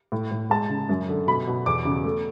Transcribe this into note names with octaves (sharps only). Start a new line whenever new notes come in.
A2
A2
G#3 A5
C#3
F#2
D3
B2 B5
B2
E2 D6
C#3
A3